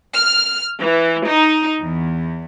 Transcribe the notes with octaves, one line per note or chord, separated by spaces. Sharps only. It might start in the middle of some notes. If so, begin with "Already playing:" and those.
F6
E3
D#4
E2